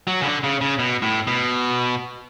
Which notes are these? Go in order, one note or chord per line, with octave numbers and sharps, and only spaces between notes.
F#3
C#3
D3
C#3
C#3
B2
A2
B2